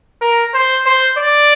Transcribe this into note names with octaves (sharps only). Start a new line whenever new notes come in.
A#4
C5
C5
D5